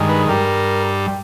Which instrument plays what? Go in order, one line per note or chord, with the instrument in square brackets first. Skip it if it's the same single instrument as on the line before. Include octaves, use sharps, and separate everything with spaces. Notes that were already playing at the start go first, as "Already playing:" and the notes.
Already playing: [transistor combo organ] G2 D#3 G#3
B4
G2 G3 A#4